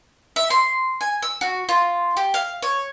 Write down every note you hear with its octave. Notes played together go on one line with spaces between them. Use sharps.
E5
C6
G#5
E6
F#4
F4
G4
F5
C#5